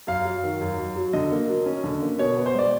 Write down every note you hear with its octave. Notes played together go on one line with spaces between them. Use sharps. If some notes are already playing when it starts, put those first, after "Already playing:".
F#2 F5
F#3
D#3
F#2
F#2
F#3
D3 D#5
A#3
F#3
C#4
D3
A#3
B2 C#5
B3
C5
G#3 D5